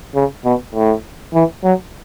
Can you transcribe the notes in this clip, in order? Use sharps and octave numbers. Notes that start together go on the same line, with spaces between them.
C#3
B2
A2
E3
F#3